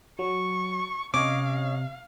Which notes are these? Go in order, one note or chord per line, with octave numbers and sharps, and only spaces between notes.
F#3 C#6
C3 C4 C#4 C#5 D#5 F5 D6